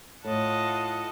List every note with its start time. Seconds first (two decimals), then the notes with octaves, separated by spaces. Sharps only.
0.25 A2 F4 D#5 F#5 A5